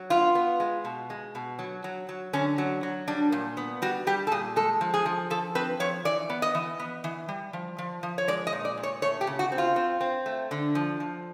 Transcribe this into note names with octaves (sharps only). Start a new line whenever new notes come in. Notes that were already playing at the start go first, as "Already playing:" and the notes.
Already playing: F#3
B3 F4
B3
G#3
B2
G#3
B2
F#3
F#3
F#3
D3 C#4
F#3
F#3
G3 D4
A#2
B3
G3 F#4
G3 G4
A4
A#2 G#4
G#3 A4
F3
G#4
F3
F3 A4
C4 B4
F3 C#5
E3 D5
B3
D#5
E3
B3
E3
G3
F3
F3
F3
C#5
G#3 D5
D#5
A#2
D5
A#2
C#5
A3 C#5
G4
C#3
F#4
C4
F4
C4
C4
A3
D3
F3
F3